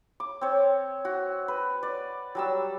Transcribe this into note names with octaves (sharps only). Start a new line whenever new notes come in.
D6
C4 C#5
F#4
B4
D5
F#3 G3 E6